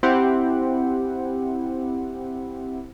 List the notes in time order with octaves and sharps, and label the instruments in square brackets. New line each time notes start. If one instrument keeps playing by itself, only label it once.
[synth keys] C4 E4 G4 F#5